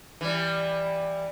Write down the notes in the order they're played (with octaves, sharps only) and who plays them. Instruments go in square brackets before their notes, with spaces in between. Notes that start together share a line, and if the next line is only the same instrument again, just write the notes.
[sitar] E3 G3